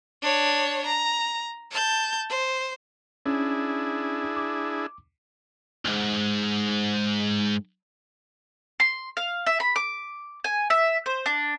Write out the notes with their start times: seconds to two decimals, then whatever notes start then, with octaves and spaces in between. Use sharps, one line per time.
0.22 D4 C#5
0.85 A#5
1.71 A5 G6
2.29 C5
3.26 C#4 D4 E4 G#4
4.36 D6
5.85 B1 G#2
8.80 C6
9.17 F5
9.46 E5
9.60 B5
9.76 D6
10.44 G#5
10.70 E5
11.06 C5
11.26 D4